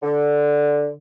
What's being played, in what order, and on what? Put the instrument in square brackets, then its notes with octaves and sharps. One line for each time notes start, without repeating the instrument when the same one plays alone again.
[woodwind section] D3